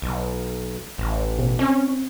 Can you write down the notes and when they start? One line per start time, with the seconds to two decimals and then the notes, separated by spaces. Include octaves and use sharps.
0.02 B1
0.98 A1
1.39 B2
1.59 C4 C#4